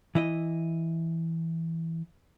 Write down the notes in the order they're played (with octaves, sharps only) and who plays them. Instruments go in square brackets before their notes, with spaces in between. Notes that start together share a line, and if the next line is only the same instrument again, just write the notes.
[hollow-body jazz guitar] E3 E4 D#5